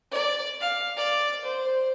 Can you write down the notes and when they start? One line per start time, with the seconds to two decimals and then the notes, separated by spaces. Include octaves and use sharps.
0.12 D5
0.61 F5
0.97 D5
1.44 C5